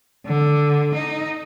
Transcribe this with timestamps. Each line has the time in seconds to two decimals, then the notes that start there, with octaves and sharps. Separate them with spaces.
0.25 D3
0.94 D#4